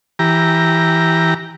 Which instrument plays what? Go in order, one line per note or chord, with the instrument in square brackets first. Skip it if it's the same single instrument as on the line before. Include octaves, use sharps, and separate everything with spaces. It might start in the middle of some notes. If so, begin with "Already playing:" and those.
[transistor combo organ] E3 G4 A#5